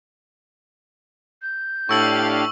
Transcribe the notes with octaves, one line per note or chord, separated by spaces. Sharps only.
G6
A2 D4 G4 F5 C#6 E6 F#7